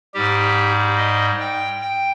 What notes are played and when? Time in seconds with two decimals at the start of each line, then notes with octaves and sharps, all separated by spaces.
0.14 G#2 G3 G4
0.97 D#5
1.40 G5
1.82 G5